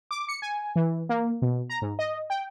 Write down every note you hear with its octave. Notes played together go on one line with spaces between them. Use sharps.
D6
C#7
G#5
E3
A#3
B2
A#5
G#2
D#5
G5